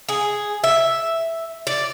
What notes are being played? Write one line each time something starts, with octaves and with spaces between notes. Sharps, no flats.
G#4
E5
D5